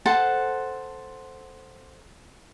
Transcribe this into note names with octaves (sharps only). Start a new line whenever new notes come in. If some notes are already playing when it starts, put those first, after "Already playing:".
A4 C5 F#5 A5